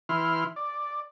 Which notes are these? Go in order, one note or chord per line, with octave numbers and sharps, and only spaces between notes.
E3 E4 C6 F6
D5